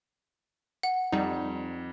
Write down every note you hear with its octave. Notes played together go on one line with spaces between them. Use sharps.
F#5
F2 G3 D#4